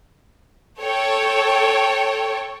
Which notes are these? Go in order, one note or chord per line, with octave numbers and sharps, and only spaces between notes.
A4 C#5 G5